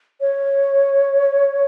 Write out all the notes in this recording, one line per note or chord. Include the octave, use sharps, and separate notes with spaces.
C#5